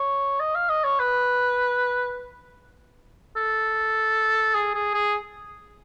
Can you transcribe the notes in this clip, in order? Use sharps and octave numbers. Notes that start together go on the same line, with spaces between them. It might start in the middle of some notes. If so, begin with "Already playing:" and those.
Already playing: C#5
D#5
F5
D#5
C#5
B4
A4
G#4
G#4
G#4